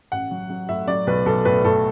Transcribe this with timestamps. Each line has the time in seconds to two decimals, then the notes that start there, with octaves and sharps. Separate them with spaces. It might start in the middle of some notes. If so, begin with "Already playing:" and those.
0.12 A1 F#5
0.31 F#3
0.50 F#3
0.69 A2 E5
0.88 F#3 D5
1.07 B1 B4
1.26 B1 A4
1.45 A2 B4
1.65 A2 A4